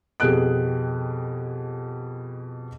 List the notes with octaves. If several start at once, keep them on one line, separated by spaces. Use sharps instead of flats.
F2 B2 G4 G#4 F#6 D7